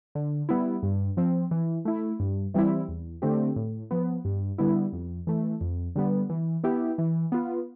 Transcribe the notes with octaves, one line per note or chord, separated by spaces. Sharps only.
D3
G3 B3 E4
G2
F3 C4
E3
A3 E4
G2
E3 G3 C4 E4
E2
D3 A3 C4 G4
A2
F3 B3
G2
D3 G3 B3 E4
F2
E3 A3
F2
D3 G3 B3
E3
B3 E4 G4
E3
B3 F4